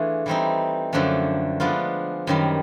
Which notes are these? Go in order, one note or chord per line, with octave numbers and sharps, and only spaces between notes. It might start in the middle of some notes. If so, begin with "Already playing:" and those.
Already playing: E3 A3 D4 F4 G#4
E3 G3 C4 D#4
F#2 D3 F3 A3 D4
F3 G#3 B3 D4 F4
F#2 D#3 G3